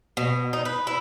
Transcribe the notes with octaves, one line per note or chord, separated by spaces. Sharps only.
B2
D#4
B4
E4